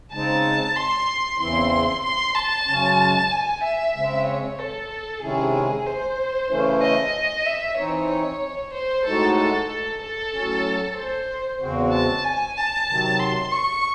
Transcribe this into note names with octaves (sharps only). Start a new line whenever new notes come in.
C#3 G#3 C4 D#4 A5
C6
E2 C#3 E3 C4 E4 C6
C6
A5
F#2 C#3 G#3 C#4
G#5
E5
C#3 G#3 C4
C#5
A4
C3 D#3 G#3 C#4 E4 G#4
G#4
C5
C#3 E3 A3 C#4 E4
D#5
E5
E3 C4 D#4 C#5
C#5
C5
A2 G#3 D#4 F#4 A4
A4
A4
A4
A2 F#3 C#4
C5
E2 C#3 G#3 C4 F#4
A5
G#5
A5
C3 D#3 F#3
C6
C#6